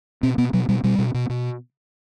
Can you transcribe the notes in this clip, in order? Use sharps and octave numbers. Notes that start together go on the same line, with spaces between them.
B2 C4
B2 B3
B2 F#3
B2 G3
B2 G3
B2
B2
B2